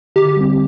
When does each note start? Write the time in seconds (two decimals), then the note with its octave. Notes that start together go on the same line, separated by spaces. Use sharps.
0.16 D3 G4
0.36 G3 C4